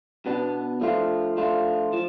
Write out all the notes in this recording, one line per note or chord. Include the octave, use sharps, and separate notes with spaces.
B2 B3 D4
F3 A3 D4 F4
F3 A3 D4 F4
F3